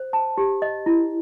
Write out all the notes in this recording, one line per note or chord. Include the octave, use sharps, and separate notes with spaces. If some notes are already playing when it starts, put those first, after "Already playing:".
Already playing: C5
A5
G4
D#5
E4